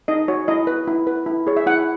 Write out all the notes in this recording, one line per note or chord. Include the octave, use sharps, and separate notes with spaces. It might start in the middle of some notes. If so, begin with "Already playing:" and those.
D#4 D#5
F#4 C#5
E4 D#5
B4
E4
B4
E4
G#4 C#5
E5
E4 F#5